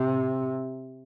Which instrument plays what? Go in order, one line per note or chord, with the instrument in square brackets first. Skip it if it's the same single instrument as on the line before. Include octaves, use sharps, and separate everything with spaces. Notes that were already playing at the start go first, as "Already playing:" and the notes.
Already playing: [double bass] C3